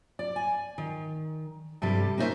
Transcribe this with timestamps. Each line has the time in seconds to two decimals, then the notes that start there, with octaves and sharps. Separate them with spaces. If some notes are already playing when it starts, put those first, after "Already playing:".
0.19 D5
0.36 G#5
0.78 D#3
1.82 G2 C3 G3 A4
2.18 A#3 C#4 D#4 F#4 C5 E5